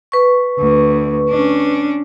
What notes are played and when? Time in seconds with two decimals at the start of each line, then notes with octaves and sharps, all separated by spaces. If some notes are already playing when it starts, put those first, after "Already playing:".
0.12 B4 C#6
0.59 D2
1.29 C#4 D4